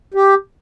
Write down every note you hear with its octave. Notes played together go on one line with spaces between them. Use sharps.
G4